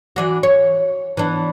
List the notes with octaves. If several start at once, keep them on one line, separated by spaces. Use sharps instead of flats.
E3 D4 F#4
C#5
E3 B3 D4